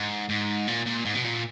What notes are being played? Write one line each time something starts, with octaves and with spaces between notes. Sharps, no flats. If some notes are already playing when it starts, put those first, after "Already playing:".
Already playing: G#2
G#2
A#2
A#2
G#2
B2
A#2